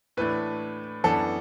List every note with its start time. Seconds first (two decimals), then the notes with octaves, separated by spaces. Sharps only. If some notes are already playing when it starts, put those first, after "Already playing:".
0.17 A2 E3 A3 D4 B4
1.04 F#2 E3 B3 D4 A4